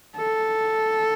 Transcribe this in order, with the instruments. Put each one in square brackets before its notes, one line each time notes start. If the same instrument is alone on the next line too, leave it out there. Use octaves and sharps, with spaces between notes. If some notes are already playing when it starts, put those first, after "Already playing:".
[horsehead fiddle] A4